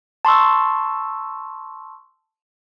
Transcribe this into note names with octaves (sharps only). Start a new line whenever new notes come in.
A5 C6 C#6 E6